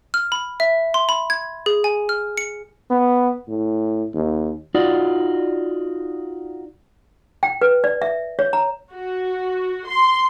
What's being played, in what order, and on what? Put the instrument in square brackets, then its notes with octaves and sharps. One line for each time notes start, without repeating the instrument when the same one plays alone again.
[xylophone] F6
B5
E5
C6
B5
G#6
G#4
G#5
F6
C#7
[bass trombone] B3
A2
D#2
[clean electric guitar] D#4 F4 F#4 D5
[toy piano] G5
B4
D5
E5
C#5
A#5
[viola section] F#4
C6